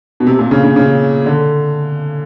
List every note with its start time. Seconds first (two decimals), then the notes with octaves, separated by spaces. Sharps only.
0.20 B2
0.27 C3
0.39 A#2
0.51 C#3
0.64 C#3
0.76 C#3
1.26 D3